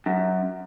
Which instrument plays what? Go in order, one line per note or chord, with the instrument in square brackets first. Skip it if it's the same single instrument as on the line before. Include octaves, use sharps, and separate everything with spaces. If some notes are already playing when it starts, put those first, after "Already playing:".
[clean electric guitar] F#2